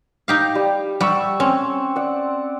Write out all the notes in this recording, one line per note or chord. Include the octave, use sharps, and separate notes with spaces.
D#4 G4 F5
G3
G3 F#5 C#6 E6
C4 C#4
D5 F#5